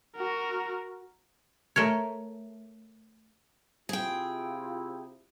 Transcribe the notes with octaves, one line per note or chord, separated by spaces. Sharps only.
F#4 A#4
A3 A#4 C#5
C3 E4 F4 G#4 G5